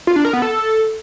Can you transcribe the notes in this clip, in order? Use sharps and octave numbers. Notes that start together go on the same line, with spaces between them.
F4
D4
A#4
B3
A4